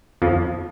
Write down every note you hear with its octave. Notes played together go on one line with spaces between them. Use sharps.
F2 F3